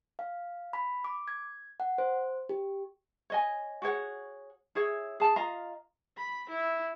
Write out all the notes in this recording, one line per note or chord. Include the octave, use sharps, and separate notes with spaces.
F5
B5
D6
G#6
F#5
C5
G4
C#5 D#5 G#5
F#4 G#4 C#5 F#5
E4 G#4 C#5
G#4 A5
F4 D#5 F5 A#5
B5
E4